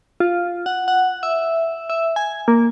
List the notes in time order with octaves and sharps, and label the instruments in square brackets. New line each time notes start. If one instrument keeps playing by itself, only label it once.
[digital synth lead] F4
F#5
F#5
E5
E5
G#5
A#3